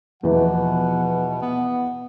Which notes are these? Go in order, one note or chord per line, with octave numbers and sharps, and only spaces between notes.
E2 B2 E3 F3 B3 F#5
B3